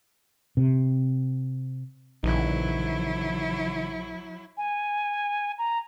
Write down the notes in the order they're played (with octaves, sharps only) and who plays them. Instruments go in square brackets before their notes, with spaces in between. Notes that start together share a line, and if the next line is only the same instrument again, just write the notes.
[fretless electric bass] C3
[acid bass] A#1 [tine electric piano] C#3 E3 D#4 [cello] F#3 E4
[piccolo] G#5
A#5